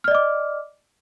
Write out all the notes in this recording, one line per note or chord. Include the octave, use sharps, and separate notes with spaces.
D5 D#5 D6 F6